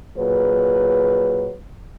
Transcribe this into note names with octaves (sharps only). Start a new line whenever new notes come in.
A#2 F#3 G#4 B4